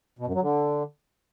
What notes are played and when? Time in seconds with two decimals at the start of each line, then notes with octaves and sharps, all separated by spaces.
0.19 B2
0.27 F#2
0.34 F#3
0.42 D3